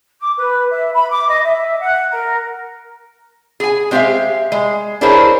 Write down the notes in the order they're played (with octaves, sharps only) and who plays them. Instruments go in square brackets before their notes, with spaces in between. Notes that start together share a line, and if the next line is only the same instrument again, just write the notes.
[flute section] D6
B4
E5
B5
D6
D#5
E5
F#5
A#4
[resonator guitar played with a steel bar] G#4 G#5
G#3 C4 G4 A#4 E5 F5
G#3
D4 E4 G#4 A#4 C5 C#5